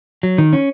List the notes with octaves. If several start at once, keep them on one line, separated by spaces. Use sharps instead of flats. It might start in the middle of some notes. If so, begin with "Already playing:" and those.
F#3
D#3
C#4